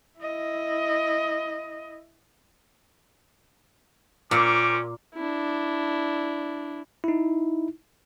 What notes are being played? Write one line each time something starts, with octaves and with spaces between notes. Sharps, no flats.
E4 D#5
A#2 C4 C#4 D6
D4 E4
D#4 E4